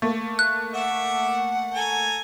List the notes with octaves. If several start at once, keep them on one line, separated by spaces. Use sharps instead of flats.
A3 A#3
F#6
E5 F#5 D6 E6
A4 G#5 A#5